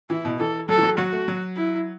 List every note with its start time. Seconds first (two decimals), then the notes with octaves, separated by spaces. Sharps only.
0.10 E3 E4
0.25 B2
0.39 E3 A4
0.69 F#3 A4
0.78 E3
0.83 F#3
0.98 F#3 F#4
1.12 A3
1.28 F#3
1.56 E4